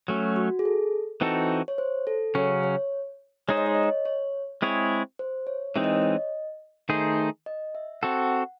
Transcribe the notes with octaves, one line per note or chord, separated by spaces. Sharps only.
F#3 A3 C#4 F#4
F#4
G#4
A4
E3 C4 D#4 F#4 A4
C#5
C5
A4
C#3 F#3 C#4 C#5
C#5
G#3 D#4 G#4 C5 C#5
D#5
C#5
D#5
C#5
C#5
G#3 C4 E4 G#4 C#5
C5
C#5
E3 G#3 C4 D#4 E5
D#5
C#5
D#5
D#3 A3 D#4 G#4 C5
D#5
E5
C4 F#4 A4 F#5